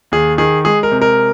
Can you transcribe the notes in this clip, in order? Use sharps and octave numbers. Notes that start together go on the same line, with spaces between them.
D#2 G#4
D#3 G#4
G#3 G#4
A#4
C3
A#4